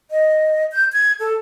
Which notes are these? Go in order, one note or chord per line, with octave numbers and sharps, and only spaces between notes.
D#5
G6
G#6
A4